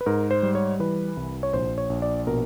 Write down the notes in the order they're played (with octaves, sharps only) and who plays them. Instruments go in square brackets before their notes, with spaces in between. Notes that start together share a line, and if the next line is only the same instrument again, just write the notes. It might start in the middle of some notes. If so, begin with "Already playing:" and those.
[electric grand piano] B4
G#2 A#4
C5
G3
C#5
E3 B4
C2
C#5
A#1 C5
C#5
A#1
D5
B2 A#4